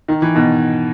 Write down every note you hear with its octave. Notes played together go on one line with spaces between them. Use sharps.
D#3
E3
B2 D#3